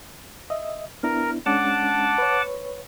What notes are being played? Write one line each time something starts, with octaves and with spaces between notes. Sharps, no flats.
D#5 E5
B3 D4 E4 A#4
G#3 C#4 D4 F#5 A5 D6
B4 C#5